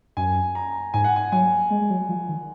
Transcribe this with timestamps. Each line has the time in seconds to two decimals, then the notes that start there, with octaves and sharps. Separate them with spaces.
0.17 F#2 G#5
0.55 A#5
0.94 G#2 G#5
1.04 F#5
1.16 G#5
1.32 F#3 G#5
1.71 G#3
1.81 G#3
1.90 F#3
2.09 F3
2.29 D#3